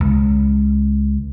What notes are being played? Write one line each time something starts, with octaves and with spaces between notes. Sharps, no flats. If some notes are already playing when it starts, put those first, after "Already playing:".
C#2